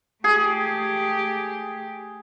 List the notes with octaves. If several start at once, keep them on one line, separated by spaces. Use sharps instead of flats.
A3 G4 G#4